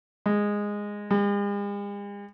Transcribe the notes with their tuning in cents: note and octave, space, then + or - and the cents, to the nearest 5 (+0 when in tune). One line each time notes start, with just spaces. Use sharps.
G#3 -10
G#3 -45